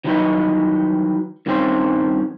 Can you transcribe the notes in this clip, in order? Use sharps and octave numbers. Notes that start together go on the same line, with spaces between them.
D#3 E3 F#3 G3 D#4 B4
G2 D#3 G3 C4 C#4 C5